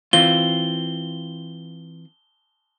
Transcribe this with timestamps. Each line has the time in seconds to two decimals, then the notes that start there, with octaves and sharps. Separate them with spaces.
0.13 E3 C4 F4 G7